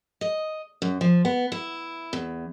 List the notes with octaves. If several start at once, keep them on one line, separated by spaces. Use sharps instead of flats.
D#5
F#2
F3
B3
E4
E2